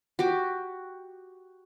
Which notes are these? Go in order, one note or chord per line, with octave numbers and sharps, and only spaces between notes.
F#4 G4 D6